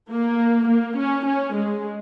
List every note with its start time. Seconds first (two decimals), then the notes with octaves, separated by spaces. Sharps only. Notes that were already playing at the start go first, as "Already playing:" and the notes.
0.10 A#3
0.68 A#3
0.97 C#4
1.26 C#4
1.54 G#3